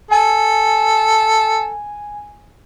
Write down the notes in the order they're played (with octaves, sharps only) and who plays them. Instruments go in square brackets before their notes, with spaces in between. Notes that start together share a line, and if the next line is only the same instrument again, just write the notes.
[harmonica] A4 [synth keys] G#5